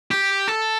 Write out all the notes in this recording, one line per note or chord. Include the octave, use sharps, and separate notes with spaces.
G4
A4